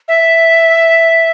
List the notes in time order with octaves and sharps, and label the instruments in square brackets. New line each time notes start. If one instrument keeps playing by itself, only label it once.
[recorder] E5